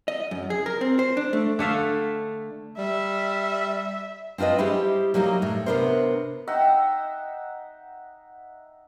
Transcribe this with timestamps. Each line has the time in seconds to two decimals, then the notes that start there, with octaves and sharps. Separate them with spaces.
0.08 D#5
0.31 F#2
0.50 G#4
0.66 A#4
0.81 C4
0.99 C5
1.17 D4
1.33 A3
1.59 D3 A3 E5 F5
2.78 G3 E5
4.38 C4 D4 F4 B4 D#5
4.58 G3 E4 G4 G#4 C5
5.14 F#3 G3 A#3 D#4 F#4
5.42 A2
5.66 C3 B3 C4 D4 A#4 C5
6.48 D#4 E5 F#5 G5